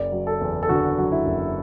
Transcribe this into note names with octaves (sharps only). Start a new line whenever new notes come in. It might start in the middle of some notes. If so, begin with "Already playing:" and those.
Already playing: F#1 D5
F#3
A4
E2
A4
D3 F#4
F#3
E4
F#1